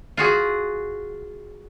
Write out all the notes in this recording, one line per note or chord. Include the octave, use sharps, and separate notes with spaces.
F4 F#4 G#4